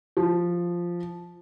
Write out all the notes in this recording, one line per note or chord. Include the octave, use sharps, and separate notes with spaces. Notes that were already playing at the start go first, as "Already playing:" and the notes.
F3